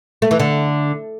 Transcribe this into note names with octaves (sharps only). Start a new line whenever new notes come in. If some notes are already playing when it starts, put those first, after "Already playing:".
A3
E3
D3